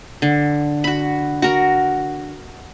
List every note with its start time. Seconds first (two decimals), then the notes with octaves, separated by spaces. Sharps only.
0.22 D3
0.84 F#4 B5
1.42 F#4 A#4